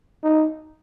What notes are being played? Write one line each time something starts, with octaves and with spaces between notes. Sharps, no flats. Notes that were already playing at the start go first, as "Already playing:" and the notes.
D#4